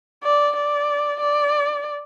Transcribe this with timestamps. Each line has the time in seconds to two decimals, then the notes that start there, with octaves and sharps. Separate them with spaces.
0.23 D5
0.56 D5
1.20 D5